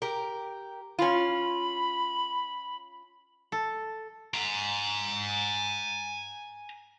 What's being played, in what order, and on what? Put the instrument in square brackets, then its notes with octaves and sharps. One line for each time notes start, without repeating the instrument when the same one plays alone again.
[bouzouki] G4 A#4
[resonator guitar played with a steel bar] C#4 F4 [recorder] B5
[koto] A4
[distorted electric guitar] G#5 A#5